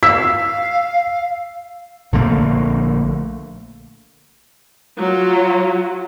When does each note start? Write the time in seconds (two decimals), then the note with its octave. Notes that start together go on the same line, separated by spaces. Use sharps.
0.03 F5 E6 B6
2.12 A#1 D3 A3 A#3
4.98 F#3 F4